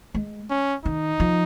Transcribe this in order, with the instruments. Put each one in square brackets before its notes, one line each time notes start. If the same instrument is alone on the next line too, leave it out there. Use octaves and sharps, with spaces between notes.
[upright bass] G#3
[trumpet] C#4
[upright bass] D#3 [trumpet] D#4
[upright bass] F3